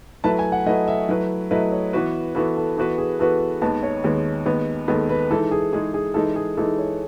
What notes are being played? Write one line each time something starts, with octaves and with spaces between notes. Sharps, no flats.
F#3 A3 E4 B4 A5
G#5
F#5
F#3 A3 E4 B4 D#5
E5
F#3 A3 E4 B4
F#3 A3 E4 B4 D#5
C#5
E3 B3 F#4 B4
E3 B3 F#4 A4 B4
A4
E3 B3 F#4 A4 B4
G#4
E3 B3 F#4 A4 B4
D#2 D#3 G#3 B3 A5
C#5
D#2 D#3 G#3 B3
D#2 D#3 G#3 B3
D#2 D#3 G#3 B3 A4
B4
E3 G#3 D#4 A4
G#4
E3 G#3 D#4 G#4
G#4
E3 G#3 D#4 A4
G#4
E3 G#3 D#4 A4
C#5